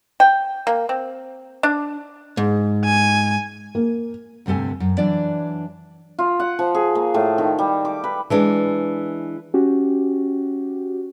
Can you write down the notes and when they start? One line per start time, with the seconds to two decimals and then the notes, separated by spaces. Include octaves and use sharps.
0.20 G5
0.67 A#3
0.89 C4
1.63 D4
2.37 G#2
2.85 G#5
3.75 A#3
4.46 D2 G2 C3 A4 G#5
4.80 F#2
4.98 E3 F#3 D4 D5
6.19 F4
6.40 F#5
6.59 F3
6.75 G#4
6.95 A#3
7.14 A2
7.38 D#3
7.58 G3
7.85 D6
8.04 B4
8.30 E3 G#3 D4
9.54 C#4 F#4 G4